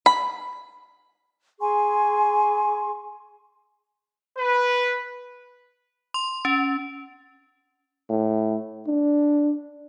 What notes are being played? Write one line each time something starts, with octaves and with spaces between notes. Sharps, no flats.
B5
G#4 G#5 C6 C#6
B4
C6
C#4
A2
D4